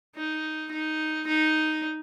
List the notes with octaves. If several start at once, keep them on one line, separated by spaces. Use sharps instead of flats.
D#4
D#4
D#4